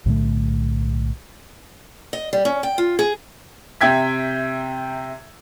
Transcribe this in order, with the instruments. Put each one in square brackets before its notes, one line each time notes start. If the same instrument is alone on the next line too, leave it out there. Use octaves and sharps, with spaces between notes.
[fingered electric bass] B1 A2 D3 A3
[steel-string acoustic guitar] D#5
G3
C#4
G5
F4
G#4
[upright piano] C3 E5 G5 G#6 B6